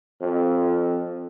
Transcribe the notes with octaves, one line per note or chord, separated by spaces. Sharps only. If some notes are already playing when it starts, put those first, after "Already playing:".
F2